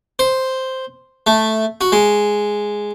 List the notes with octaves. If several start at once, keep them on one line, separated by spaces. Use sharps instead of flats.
C5
A3
F#4
G#3